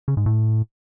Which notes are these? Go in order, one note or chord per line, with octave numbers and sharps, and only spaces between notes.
C#3
G#2
A2